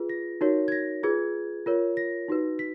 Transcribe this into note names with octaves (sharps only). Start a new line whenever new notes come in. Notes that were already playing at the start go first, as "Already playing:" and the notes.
Already playing: F4 G#4 B4
A#6
D#4 F#4 A#4 C#5
G#6
A#6
F4 G#4 B4 G#6
F4 A#4 C#5
A#6
D#4 F#4 B4
B6